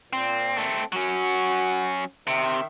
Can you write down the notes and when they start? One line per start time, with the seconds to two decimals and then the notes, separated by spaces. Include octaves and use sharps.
0.13 A#2 C4
0.57 A3 C4
0.92 F#3 C#4 F#4
2.28 C3 D#3 E5